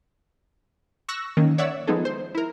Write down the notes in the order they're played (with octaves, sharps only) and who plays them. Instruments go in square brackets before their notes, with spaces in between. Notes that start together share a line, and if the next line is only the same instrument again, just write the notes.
[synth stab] C#6 E6 F#6 A#6
D#3 A#3 C#4
C#5 D5 E5 F#5 E6
F3 G#3 B3 D#4 G#4 A4
C5
E4 A#4